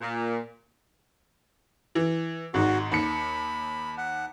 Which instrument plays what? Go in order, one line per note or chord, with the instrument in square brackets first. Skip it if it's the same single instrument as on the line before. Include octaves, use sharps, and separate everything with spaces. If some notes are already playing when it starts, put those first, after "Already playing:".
[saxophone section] A#2
[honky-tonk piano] E3
[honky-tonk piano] G#1 G#2 [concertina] F#4
[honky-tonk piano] D#2 C#7 [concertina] B5
[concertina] F#5